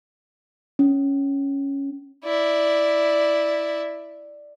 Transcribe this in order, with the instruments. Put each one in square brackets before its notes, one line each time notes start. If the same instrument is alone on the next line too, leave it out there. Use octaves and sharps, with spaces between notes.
[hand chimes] C#4
[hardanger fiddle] E4 D5